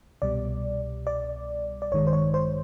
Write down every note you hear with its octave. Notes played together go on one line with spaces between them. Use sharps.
C2 B2 G3 D5
D5
D5
A1 G2 D#3 G#3 C#5
C5
C#5
C5